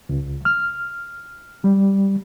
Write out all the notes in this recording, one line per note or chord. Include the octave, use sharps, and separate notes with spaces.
C#2
F6
G3